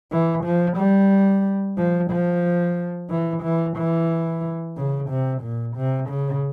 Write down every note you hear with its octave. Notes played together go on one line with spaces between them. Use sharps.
E3
F3
G3
F3
F3
E3
E3
E3
C#3
C3
A#2
C3
C#3